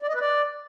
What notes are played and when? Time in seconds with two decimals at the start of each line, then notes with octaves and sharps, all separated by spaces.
0.02 D5
0.08 D#5
0.14 B4
0.21 D5